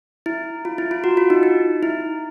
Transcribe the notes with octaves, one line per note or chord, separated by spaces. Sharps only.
E4
F4
E4
F4
F#4
F4
D#4
D#4
E4